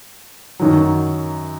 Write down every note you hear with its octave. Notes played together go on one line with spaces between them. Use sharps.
F#2 D#3 F#3